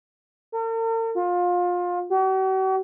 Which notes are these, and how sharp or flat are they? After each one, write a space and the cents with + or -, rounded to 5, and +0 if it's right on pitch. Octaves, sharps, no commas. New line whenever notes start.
A#4 -45
F4 +25
F#4 +45